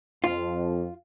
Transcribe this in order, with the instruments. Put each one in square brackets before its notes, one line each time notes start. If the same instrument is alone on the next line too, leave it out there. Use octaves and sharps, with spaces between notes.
[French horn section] F2 [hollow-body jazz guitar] F4